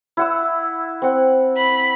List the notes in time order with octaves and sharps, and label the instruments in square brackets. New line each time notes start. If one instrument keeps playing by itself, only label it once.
[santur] E4 F#5 E6
C4 F#5
[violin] B5